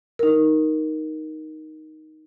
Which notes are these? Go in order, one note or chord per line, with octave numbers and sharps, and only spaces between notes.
D#4 A#4